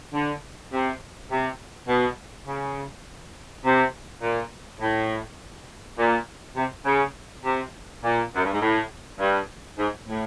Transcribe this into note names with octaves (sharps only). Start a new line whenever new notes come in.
D3
C3
C3
B2
C#3
C3
A#2
A2
A#2
C3
C#3
C3
A#2
F#2
G2
G#2
A2
G2
G#2
A2